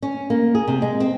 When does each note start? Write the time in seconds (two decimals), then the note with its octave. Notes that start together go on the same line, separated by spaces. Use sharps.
0.03 C#4
0.30 A#3
0.55 G#4
0.68 C3
0.82 G#3
1.00 C4